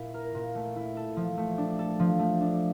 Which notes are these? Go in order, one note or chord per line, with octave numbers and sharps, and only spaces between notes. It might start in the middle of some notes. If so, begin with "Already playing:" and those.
Already playing: A#2 E4
A#4
A#2
A3
E4
A4
F3
A3
D4
A4
F3
A3
D4